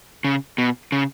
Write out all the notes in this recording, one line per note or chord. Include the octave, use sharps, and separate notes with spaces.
C#3
B2
C#3